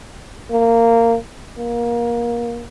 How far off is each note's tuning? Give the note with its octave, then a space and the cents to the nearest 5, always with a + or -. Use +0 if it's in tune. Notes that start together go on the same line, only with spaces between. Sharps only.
A#3 -15
A#3 +20